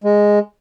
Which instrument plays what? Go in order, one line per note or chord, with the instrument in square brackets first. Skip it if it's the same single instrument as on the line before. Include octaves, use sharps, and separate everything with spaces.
[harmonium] G#3